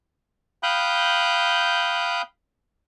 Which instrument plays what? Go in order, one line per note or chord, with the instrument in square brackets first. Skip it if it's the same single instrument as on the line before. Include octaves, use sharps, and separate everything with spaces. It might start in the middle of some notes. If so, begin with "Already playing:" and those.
[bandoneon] F5 G5 B5 D#6 F#6 G6